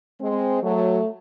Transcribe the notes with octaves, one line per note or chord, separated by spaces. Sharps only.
G#3 C4
F#3 A3